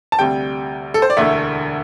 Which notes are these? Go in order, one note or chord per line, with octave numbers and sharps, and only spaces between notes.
A5
D2 C3 G3 G5
A4
C5
D5
E1 D2 D3 A3 E5